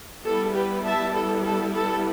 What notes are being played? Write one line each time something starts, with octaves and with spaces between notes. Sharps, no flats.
G3 B3 E4 A4
G4 B4
E5 A5
A4
A4
A4